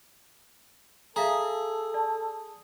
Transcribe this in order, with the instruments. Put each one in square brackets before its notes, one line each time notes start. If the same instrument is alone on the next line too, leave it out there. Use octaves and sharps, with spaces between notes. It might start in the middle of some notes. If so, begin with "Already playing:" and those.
[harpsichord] G#4 [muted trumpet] A4 [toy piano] E5 F5 A#5
[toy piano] D5 A5